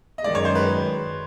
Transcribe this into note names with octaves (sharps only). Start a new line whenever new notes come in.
D#5
F#2 D#3 G#3 D5
C#5
C5
B4